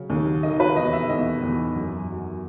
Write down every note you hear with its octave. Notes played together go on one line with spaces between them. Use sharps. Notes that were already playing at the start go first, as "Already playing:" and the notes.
Already playing: C#3 F#3
D#2
D#3 D#5
B4
E2 D#5
E5
E2 D#5
E2
F#2
F#3